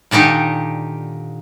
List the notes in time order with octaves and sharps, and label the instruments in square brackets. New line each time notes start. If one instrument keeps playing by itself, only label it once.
[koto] A#2 D3 D#3 D#4 G4